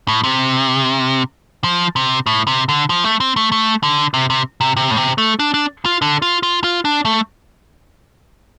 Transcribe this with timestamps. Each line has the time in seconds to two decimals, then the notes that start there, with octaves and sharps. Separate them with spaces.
0.08 A2
0.24 C3
1.64 F3
1.96 C3
2.26 A2
2.47 C3
2.69 D3
2.90 F3
3.04 A3
3.20 C4
3.36 A3
3.52 A3
3.83 D3
4.14 C3
4.30 C3
4.61 C3
4.77 C3
4.91 A2
4.97 C3
5.18 A3
5.39 D4
5.54 D4
5.86 F4
6.02 D3
6.22 F4
6.43 F4
6.64 F4
6.85 D4
7.05 A3